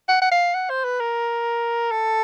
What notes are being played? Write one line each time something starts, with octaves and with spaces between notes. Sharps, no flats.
F#5
F#5
F5
F#5
C5
B4
A#4
A4